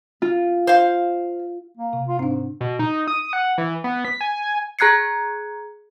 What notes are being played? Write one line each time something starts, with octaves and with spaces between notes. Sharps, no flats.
F4
C5 F5
A#3
C3
F4
G#2 C4 D4
B2
D#4
D#6
F#5
E3
B3
B6
G#5
G#4 A#5 F#6 G#6 C7 C#7